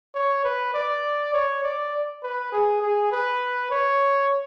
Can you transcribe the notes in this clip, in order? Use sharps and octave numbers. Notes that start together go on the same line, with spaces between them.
C#5
B4
D5
C#5
D5
B4
G#4
G#4
B4
C#5